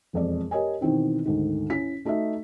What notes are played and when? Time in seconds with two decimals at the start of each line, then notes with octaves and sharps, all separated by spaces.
0.13 E1 F2 D5
0.51 G4 A#4 C#5 D#5 G#5
0.81 B2 D#3 E3 C4 D#4
1.26 D2 G#2 D#3
1.70 C#4 E4 B6
2.05 A3 D#4 F#4 A4 E5